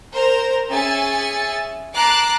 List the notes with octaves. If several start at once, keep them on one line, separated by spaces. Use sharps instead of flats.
A#4 C5 A#5
C#4 G#4 E5 G#5 A6 C#7
A5 A#5 D6 F#6 C7 D7